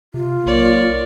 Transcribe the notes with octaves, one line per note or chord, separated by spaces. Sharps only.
C3 F4
B1 A#3 C#5 D5